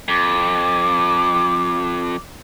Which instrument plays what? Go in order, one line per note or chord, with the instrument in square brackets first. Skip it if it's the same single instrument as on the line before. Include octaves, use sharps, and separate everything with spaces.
[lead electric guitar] F2 [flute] D6